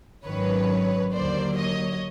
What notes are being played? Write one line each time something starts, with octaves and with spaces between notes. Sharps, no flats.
G#1 F#2 D#3 B4 C#5
D#2 D3 F#3 A#3 C5 D5
C#5 D#5